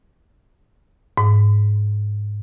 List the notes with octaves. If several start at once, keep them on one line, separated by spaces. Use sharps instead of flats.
G#2